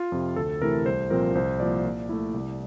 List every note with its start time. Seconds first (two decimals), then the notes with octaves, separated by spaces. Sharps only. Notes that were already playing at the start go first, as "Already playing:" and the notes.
Already playing: F4
0.12 F2 C3
0.36 D2 A4
0.61 C3 E3 A3 E4 A#4
0.86 C2 C5
1.10 A#2 F3 C4 A#4
1.35 C2 C5
1.60 A#2 F3 A#3 D5
1.84 A#2
2.09 A3 E4
2.34 C2